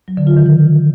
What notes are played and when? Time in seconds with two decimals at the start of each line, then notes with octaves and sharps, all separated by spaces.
0.08 F#3
0.17 D3
0.27 F4
0.37 D#3
0.46 E3